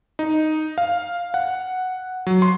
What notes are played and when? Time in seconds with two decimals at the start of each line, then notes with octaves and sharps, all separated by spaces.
0.19 D#4
0.78 F5
1.34 F#5
2.27 F#3
2.42 C6